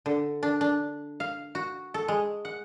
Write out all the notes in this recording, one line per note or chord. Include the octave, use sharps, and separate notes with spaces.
D3
D4
D4
F5
F#4
A4
G#3
F#5